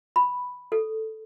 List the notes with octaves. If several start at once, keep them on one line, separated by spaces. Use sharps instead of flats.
B5
A4